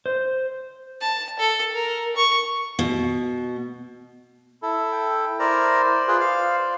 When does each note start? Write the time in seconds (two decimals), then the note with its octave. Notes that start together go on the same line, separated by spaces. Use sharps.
0.06 C5
1.01 A5
1.39 A4
1.74 A#4
2.16 C#6
2.79 B2
4.63 E4 A4
4.92 G5
5.39 E4 A#4 C5 D5 A#5
6.08 F4 G#4 B4
6.20 F5